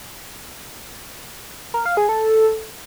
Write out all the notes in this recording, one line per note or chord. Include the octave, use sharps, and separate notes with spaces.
A#4
F5
G#4
A4